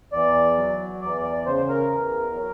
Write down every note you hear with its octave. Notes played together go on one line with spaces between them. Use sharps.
E2 D5
F#3
E2 D5
D5
C#3 C5
A#4
E2
F#3